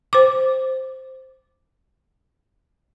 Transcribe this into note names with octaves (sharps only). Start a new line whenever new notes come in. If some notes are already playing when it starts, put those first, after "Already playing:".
C5 D6